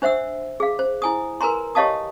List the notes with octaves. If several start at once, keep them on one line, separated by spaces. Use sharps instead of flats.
D4 C5 E5 F#5 E6
G#4 F5
C5
E4 G#5 D#6
A#4 B4 G#5 A#5 C6
G4 C#5 D#5 F5 A5 D#6